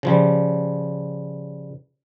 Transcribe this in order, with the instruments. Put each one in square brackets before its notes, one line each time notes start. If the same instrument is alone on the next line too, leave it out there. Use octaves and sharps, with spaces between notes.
[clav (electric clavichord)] C#3 F3 G3